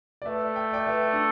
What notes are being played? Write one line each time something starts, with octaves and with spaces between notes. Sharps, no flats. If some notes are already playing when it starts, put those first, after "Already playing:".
D5
A3 B4 E5
G5
D5 G5
B4 E5
D4